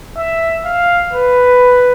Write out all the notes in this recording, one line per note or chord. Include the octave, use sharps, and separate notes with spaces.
E5
F5
B4